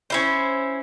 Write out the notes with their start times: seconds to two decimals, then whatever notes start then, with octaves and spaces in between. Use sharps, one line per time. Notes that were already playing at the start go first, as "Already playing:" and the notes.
0.10 C#4 E4 C5